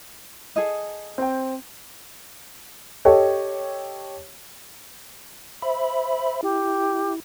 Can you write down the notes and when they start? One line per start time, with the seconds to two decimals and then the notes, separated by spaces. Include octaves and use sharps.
0.56 G#4 A4 D#5
1.18 C4 G5
3.05 G4 A4 C#5 D#5
5.62 C5 E5 B5
6.43 E4 G4